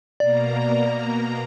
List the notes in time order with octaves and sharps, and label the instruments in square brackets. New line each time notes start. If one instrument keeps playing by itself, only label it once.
[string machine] B2 A#3 A#5 [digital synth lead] D5